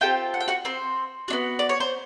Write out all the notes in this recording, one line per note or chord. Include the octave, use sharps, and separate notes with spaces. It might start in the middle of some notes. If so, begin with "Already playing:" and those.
C4 F4 G4 A4 G5
F#5
G5
F#4 F#5
C4 C5
B3 D4 F#4
D5
C#5
C5